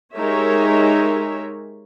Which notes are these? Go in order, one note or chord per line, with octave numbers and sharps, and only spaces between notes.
G#3 D#4 G4 A#4 C#5 E5